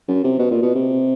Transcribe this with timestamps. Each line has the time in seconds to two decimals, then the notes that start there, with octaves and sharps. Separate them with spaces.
0.08 F#2
0.24 C3
0.39 B2
0.51 A#2
0.62 B2
0.75 C3